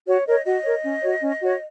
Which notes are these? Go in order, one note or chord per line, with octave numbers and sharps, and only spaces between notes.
F#4 C#5
A#4 C#5 D#5
F#4 D#5
A#4 C#5
C#4
F#4 C#5
C#4
F#4 C#5